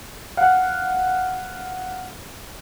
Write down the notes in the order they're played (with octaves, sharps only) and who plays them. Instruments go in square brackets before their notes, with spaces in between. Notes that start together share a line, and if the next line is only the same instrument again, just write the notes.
[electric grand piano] F5 F#5